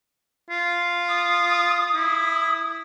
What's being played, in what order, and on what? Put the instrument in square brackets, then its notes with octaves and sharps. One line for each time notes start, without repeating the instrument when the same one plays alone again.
[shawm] F4
[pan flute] D#6
[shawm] E4